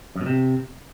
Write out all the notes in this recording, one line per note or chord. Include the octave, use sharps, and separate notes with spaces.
F#2
B2
C3